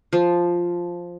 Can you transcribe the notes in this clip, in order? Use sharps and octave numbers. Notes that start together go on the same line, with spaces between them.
F3